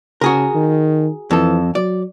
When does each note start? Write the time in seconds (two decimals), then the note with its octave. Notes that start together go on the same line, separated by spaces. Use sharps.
0.21 C#3 F#4 G#4 A#4
0.55 D#3
1.31 F2 E3 A4
1.75 F#3 D5